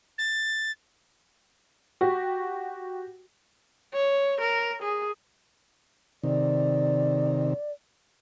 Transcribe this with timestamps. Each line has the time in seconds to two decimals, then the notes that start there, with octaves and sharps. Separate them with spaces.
0.18 A6
2.01 F#4 G4
3.94 C#5
4.41 A#4
4.83 G#4
6.24 C3 D#3 D5